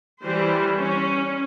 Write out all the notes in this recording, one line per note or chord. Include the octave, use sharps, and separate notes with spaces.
E3 G3 C5
C#4